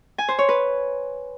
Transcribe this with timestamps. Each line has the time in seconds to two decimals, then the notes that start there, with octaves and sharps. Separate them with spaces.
0.18 G#5
0.29 C5
0.39 C#5
0.49 B4